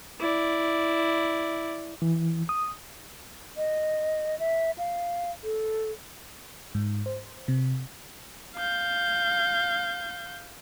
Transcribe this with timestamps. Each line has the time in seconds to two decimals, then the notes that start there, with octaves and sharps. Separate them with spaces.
0.20 E4 D5
2.02 E3
2.49 D#6
3.57 D#5
4.39 E5
4.78 F5
5.44 A4
6.75 G#2
7.06 C5
7.48 C3
8.56 F5 G6